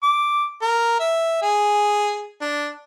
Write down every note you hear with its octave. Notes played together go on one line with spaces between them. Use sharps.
D6
A#4
E5
G#4
D4